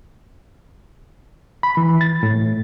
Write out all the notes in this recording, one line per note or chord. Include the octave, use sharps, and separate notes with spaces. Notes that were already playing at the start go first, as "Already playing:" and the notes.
B5
E3
A6
A2